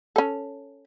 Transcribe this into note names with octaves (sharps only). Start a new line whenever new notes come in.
C#4 A4